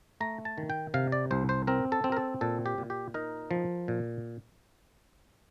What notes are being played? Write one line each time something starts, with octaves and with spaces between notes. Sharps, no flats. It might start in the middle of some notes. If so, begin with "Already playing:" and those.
A3 A#5
A5
D#3
G5
C3 F5
D5
C2 C5
C5
C4 A#4
A4
C4
A#4
A4
A#2 A4
G4
A#2
G4
D#4 A#4
F3
A#2